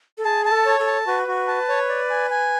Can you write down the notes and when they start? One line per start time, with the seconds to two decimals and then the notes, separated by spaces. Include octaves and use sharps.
0.18 A4
0.25 G#4 A5
0.45 A5
0.52 A4
0.66 C#5
0.79 A4
0.87 A5
1.07 F#4 B4
1.27 F#4
1.48 A5
1.69 C#5
1.89 D5
2.10 G#5
2.30 G#5